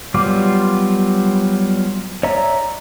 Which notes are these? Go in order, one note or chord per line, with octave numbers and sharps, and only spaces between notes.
F#3 G3 B3 F4 D6
C#5 D5 E5 A#5